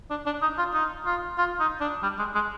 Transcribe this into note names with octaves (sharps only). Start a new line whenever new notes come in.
D4
D4
D#4
F4
D#4
F4
F4
D#4
D4
G3
G#3
G#3